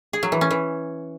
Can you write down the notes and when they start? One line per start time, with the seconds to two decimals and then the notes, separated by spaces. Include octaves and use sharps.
0.13 G#4
0.23 F#3
0.32 E3
0.41 C#4
0.51 E3